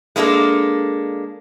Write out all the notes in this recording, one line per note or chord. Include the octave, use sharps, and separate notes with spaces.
G#3 A#3 D4 D#4 A4